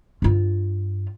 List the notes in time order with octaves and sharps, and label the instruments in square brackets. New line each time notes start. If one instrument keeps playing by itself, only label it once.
[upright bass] G2 F4